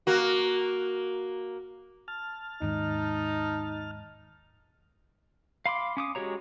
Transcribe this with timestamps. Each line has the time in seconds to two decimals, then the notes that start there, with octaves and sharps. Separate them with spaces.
0.07 A#3 F#4
2.08 A5 F6
2.62 D#2 G#2 D#4
5.66 F5 B5 C6 D6
5.97 C#4 D6 D#6
6.15 G#3 F#4 G4 C#5 A#5